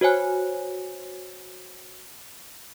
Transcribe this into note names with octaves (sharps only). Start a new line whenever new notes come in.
F#4 C5 C#5 G#5 F#6